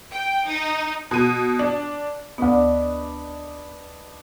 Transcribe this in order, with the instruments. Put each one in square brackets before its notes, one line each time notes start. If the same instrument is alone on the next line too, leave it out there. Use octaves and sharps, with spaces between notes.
[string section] G5
D#4
[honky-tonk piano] B2 D#7
D4
[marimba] D2 B3 [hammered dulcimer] D4 B4 D#5